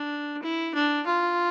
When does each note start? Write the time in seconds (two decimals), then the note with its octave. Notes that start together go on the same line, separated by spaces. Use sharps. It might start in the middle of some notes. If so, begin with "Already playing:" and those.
Already playing: D4
0.42 E4
0.74 D4
1.06 F4